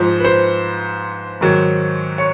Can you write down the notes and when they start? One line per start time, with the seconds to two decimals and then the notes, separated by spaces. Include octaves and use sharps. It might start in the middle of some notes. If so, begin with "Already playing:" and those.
Already playing: G#2 F3 C5
0.20 B4
0.24 C5
1.41 G#2 D#3 F#3
2.18 C#5